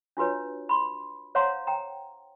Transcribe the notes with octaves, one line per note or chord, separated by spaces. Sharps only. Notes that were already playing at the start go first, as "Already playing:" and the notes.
D4 F4 F#4 B4 C#5
B5 C6
C5 C#5 F5 F#5 A#5 C6
G5 A#5